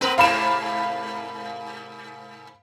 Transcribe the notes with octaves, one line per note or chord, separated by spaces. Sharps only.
B3 C4 A#4 B4
G#2 C3 A#3 F5 B5 E7